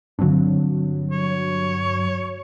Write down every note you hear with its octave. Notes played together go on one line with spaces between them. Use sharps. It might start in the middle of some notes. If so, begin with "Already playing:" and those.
G2 D3 F#3 C4 D4
C#5